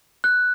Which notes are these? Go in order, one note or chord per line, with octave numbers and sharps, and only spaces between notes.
F#6